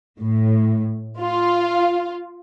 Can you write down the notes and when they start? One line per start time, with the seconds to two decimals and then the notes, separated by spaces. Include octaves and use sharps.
0.19 A2
1.20 F4